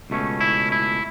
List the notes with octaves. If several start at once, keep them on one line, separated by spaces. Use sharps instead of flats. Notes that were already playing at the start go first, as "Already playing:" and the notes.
C#2 B2 A3 C#4
E4
E4